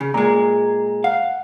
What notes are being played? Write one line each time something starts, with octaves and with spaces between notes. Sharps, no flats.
C#3
A#2 G#3 A#5
F5 F#5